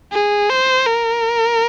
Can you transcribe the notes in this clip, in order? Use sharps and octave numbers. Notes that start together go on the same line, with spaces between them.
G#4
C5
A#4